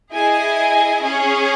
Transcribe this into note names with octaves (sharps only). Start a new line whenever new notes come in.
E4 G#4 D#5 G#5
C#4 G#4 C#5 G#5